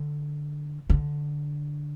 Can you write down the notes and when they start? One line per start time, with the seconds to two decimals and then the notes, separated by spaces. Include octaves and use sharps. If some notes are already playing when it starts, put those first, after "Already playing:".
Already playing: D3
0.90 D3